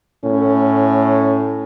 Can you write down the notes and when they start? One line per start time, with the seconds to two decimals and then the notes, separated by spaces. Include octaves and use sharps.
0.24 A2 C#4